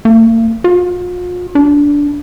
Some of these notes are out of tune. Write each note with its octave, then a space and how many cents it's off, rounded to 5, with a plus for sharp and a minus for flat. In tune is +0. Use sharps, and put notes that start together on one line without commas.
A#3 -45
F4 +40
D4 -15